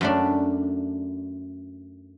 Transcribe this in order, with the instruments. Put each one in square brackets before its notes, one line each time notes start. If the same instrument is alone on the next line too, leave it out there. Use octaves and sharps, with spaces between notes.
[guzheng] F#2 A3 D4